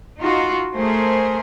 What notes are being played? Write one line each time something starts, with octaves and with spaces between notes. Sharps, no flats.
D#4 F4 F#4
A3 G#4 A#4 C5